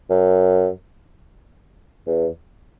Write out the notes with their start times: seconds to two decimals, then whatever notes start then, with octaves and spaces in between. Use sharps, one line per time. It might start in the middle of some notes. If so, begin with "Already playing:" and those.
0.10 F#2
2.07 E2